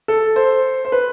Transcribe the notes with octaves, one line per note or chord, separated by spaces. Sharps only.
A4
C5
C5
B4